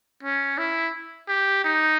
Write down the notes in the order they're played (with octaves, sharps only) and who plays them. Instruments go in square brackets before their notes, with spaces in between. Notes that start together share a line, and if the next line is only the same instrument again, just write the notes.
[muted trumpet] C#4
E4
G4
D#4